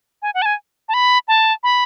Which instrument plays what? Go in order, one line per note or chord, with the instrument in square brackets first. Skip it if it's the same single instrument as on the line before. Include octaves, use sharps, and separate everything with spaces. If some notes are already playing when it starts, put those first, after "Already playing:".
[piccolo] G#5
F#5
A5
G#5
A5
B5
A5
B5